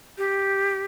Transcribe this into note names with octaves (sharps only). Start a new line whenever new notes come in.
G4